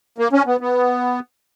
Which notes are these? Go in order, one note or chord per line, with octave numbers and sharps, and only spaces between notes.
A#3
C#4
B3
B3